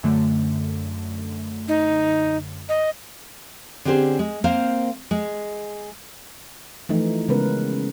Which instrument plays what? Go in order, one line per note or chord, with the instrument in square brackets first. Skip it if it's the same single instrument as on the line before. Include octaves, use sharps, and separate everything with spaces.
[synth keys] F#2 D3 A3
[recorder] D#4
D#5
[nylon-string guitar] D3 C4 C#4 G4 G#4 C5
G#3
A#3 C4 C5 F5
G#3
[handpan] E3 F3 A3 D#4
C#3 G#3 B3 C#4 A#4 B4